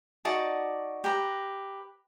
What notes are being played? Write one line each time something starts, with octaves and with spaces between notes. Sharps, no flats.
D#4 F#4 D5 A5
G4 B4 A#5